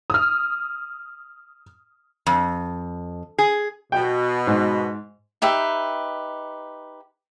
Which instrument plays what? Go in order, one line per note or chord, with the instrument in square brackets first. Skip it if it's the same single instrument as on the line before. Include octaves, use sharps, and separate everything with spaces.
[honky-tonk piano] D#6 F6
[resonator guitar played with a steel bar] F2
G#4
[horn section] B2 [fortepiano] G5
[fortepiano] G#2
[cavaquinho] D#4 G4 B4 E5